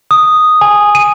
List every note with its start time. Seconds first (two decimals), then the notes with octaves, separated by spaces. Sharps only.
0.11 D#6
0.61 G#5
0.95 D#7